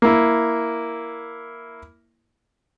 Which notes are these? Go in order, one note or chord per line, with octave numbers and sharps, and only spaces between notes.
A#3 E4